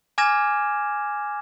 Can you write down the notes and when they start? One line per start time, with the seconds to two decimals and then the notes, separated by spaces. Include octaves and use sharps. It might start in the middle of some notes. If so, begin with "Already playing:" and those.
0.18 G#5 D6 F6 G#6 A#6 E7